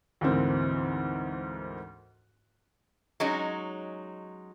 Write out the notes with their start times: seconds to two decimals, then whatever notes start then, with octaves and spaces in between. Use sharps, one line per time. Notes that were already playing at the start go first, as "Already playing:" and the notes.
0.21 D2 G#2 E3 A#3 C4
3.20 F#3 G#3 C#4 D#4